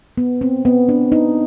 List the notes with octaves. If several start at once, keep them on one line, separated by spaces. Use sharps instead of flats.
B3
C4
B3
D4
D#4